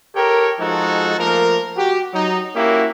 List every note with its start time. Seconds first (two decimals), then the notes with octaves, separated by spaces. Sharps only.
0.15 G4 A4 A#4 C#5 G5
0.59 F3 G#3 D#4 F#4 A4
1.18 F3 A3 A#3 A#4
1.76 F#4 G4
2.14 F#3 D#4
2.56 A#3 C#4 E4 F#4 G4